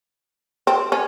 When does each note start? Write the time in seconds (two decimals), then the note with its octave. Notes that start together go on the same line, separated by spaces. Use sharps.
0.67 C4
0.92 C#4